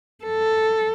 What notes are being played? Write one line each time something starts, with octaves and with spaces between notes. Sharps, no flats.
A4